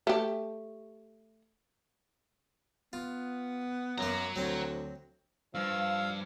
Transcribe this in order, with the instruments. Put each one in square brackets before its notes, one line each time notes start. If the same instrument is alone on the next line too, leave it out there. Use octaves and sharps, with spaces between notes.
[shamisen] A3 G4
[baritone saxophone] B3 [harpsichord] F4
[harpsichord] F#2 A#3 [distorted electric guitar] F#4 A#5
[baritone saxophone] D2 [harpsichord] F#3 C4
[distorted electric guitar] G2 [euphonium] F3 [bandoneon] F5 E6